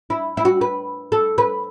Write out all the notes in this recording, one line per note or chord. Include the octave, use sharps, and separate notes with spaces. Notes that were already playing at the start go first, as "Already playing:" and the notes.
E4
E4
F#4
B4
A4
B4